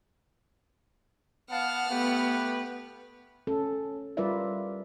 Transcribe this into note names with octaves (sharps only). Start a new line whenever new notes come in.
B3 F5 F#5 A5 F6
A3 B3 G4 B4
C#4 A4
G3 F4 A#4 B4 D5 E5